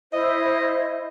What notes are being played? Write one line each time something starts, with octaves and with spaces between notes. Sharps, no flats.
E4 C5 D#5 E5